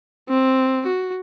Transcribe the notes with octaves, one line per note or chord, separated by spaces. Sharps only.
C4
F#4